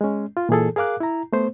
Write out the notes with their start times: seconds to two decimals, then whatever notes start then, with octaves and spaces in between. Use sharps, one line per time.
0.01 G#3 C#4
0.37 F4
0.49 A#2 E3 G#4 A4
0.76 G#4 A#4 F5 D6 F#6
1.00 E4 A#5
1.33 A3 B3 C5